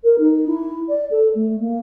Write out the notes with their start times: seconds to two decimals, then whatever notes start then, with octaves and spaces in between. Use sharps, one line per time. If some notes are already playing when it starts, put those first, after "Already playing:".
0.03 A#4
0.18 D#4
0.47 E4
0.88 D5
1.10 A4
1.35 A3
1.60 A#3